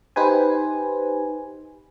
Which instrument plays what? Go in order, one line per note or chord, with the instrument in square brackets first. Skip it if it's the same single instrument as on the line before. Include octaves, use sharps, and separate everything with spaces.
[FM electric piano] D#4 G4 B4 C5 G#5